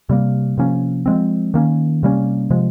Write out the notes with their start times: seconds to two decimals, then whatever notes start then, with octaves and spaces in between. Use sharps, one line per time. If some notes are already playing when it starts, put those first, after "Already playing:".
0.09 C3 G3 A#3
0.58 C3 F3 A#3 C#4
1.06 F3 G#3 C4
1.54 D#3 A#3 C#4
2.03 C3 G3 A#3 C#4
2.50 C3 F3 G#3